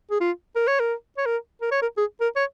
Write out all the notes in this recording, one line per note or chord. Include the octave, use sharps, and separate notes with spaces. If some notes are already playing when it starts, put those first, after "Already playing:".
G#4
F4
A#4
C#5
A#4
C#5
A#4
A#4
C#5
A#4
G#4
A#4
C#5